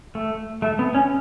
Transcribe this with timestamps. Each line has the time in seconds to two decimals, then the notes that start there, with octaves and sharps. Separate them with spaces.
0.15 A3
0.62 A3
0.79 B3
0.94 C#4